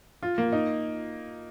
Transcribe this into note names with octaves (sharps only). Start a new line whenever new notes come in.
F4
A#3
D#4